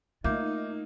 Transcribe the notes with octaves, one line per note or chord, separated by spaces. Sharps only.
A3 A#3 D#4 F4 E5 D6 G6